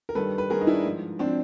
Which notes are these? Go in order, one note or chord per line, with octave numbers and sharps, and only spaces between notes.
A#4
G2 D#3 G3 A4 B4
B4
G2 D#3 G3 G#4 A#4
D#4
D4 E4
G#2 F3
C4 D4
F3